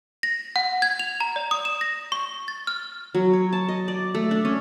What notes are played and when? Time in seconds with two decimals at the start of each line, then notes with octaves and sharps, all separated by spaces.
0.23 A#6
0.56 F#5
0.82 G#6
0.99 F7
1.20 A#5
1.36 D5
1.51 D#6
1.65 E7
1.81 A#6
2.12 C#6
2.48 A6
2.67 F6
3.15 F#3
3.33 C#5
3.53 A5
3.69 D#5
3.88 D5
4.15 A3
4.31 D4
4.45 C#4